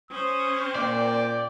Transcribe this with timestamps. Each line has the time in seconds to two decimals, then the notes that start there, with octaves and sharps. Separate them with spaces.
0.10 C#4 C5 D#6
0.75 A#2 D5 G5